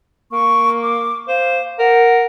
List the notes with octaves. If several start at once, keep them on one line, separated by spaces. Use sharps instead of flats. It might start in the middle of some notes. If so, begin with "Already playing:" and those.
A#3 C#6
D6
C5 F5
A#4 F#5